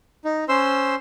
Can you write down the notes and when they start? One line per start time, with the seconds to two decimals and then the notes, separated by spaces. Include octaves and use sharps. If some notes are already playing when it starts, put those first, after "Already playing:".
0.25 D#4
0.49 C#4 C5 C6 E6